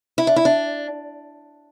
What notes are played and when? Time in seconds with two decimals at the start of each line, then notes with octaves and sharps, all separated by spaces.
0.18 E4
0.27 D4
0.36 E4
0.45 D4